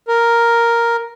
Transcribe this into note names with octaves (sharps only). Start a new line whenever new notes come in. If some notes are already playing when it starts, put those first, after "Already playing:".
A#4